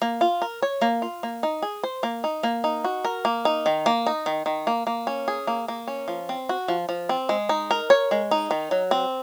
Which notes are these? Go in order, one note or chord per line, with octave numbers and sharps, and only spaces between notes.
A#3
F4
A#4
C#5
A#3
F4
A#3
D#4
G#4
C5
A#3
D#4
A#3
D#4
F#4
A#4
A#3
D#4
D#3
A#3
D#4
D#3
D#3
A#3
A#3
C#4
G#4
A#3
A#3
C#4
F3
C4
F#4
F3
F3
C4
G#3
D#4
A#4
C#5
G#3
D#4
D#3
F#3
C4